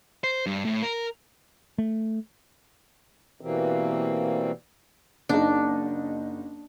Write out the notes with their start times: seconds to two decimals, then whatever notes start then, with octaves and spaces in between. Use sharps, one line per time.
0.24 C5
0.46 G2
0.65 A2
0.83 A#4
1.78 A3
3.41 B2 E3 G3 A#3 C4
5.29 F#1 D4 D#4